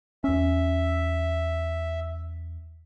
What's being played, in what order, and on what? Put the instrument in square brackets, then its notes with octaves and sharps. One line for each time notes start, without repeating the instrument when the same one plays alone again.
[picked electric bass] E2 C#4 [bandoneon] E5